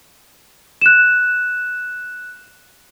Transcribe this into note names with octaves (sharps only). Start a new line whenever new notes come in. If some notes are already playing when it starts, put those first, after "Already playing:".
F#6 E7